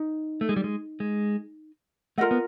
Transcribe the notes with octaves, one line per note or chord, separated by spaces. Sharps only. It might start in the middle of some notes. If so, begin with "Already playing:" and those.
Already playing: D#4
A3
G#3
G3
G#3
G#3
A3 F4 A#4 D#5 F#5
B3